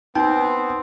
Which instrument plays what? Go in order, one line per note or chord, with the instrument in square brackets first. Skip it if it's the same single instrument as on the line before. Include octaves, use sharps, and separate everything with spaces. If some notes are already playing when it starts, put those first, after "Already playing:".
[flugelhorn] B3 [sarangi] C4 [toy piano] D#4 [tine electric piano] G5